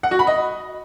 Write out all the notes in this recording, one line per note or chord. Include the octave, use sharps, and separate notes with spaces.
F#5
F#4
B5
D#5